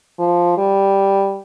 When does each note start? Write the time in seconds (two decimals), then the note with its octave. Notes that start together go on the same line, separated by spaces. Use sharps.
0.19 F3
0.57 G3